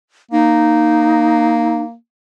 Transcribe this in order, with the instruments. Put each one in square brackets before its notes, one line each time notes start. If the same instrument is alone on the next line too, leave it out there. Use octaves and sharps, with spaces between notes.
[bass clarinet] A#3 [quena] D#4